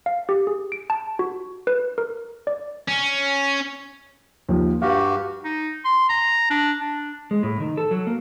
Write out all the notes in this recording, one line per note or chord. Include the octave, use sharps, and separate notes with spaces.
F5
G4
G#4
D7
A5
F#4
B4
A#4
D5
C#4
D#2 F3
G2 F#4 G4 F5
D#4
C6
A#5
D4
D4
G#3
A2
D#3
A4
F#3
A#3